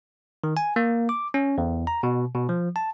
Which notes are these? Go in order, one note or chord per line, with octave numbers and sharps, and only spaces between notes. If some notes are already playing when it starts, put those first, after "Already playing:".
D#3
G#5
A#3
D6
C#4
E2
A#5
B2
B2
F3
A5